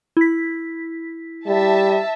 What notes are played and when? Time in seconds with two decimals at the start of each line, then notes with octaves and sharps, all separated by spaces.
0.17 E4 B6
1.47 G3 E5 A5